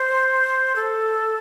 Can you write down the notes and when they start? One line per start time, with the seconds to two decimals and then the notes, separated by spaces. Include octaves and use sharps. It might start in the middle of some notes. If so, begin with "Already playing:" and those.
Already playing: C5
0.76 A4